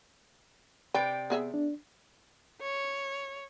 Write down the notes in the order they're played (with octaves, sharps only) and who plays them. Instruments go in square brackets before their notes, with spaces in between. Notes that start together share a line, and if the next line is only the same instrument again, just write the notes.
[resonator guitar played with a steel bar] C3 D5 G5 [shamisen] B4
[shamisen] B3 G#4 E5
[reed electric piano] D4
[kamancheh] C#5